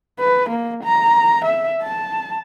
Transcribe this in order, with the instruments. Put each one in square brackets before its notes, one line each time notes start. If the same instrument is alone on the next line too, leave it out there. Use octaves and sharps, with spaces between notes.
[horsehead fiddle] B4
A#3
A#5
E5
A5